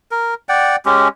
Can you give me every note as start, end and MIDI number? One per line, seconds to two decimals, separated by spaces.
0.11 0.34 70
0.49 0.76 74
0.49 0.76 78
0.49 0.76 79
0.85 1.08 56
0.85 1.08 61
0.85 1.08 67